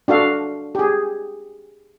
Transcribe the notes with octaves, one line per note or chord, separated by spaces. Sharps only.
D4 F#4 A4 F5
G4 G#4